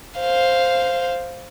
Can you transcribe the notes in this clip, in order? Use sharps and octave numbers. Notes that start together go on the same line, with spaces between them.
C5 F5